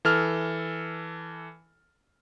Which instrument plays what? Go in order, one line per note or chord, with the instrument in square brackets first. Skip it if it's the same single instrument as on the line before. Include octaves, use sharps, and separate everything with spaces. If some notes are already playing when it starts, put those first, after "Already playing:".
[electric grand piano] E3 A4 F6